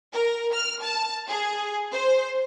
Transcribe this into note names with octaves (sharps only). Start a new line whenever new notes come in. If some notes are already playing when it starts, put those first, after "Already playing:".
A#4
F6
A5
G#4
C5